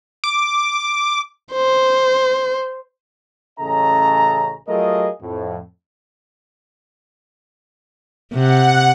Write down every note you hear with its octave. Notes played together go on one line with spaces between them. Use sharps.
D6
C5
A1 C#3 C#4 A4 D#5 A#5
F#3 A3 F4 G#4 A#4 D#5
F2 A2
C3 F#5